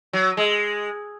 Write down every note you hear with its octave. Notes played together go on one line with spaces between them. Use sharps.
F#3
G#3